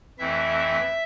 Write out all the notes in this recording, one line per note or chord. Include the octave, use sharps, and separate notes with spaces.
F2 E3 A3 C4 E4 E5